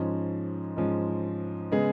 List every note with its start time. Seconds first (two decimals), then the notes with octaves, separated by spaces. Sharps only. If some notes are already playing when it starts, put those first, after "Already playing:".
Already playing: G#2 F3 G#3 C#4
0.76 G#2 F3 G#3 C#4
1.72 C#3 G#3 B3 G#4